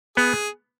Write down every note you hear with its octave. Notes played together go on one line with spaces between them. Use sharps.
B3 G#4